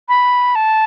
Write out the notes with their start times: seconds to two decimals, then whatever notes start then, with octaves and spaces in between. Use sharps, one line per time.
0.09 B5
0.55 A5